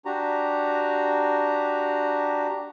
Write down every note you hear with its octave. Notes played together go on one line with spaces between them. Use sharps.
D4 F#4 G4 A#5